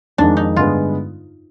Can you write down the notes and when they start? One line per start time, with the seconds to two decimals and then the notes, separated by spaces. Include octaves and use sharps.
0.18 F2 D#3 G#3 D4
0.37 D#4
0.56 G2 D3 G#3 B3 F4